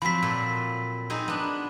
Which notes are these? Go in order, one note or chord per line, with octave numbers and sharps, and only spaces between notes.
F3 F#3 C4 B5 B6
A#2 A4
C4 D#4 G#4
B3 D4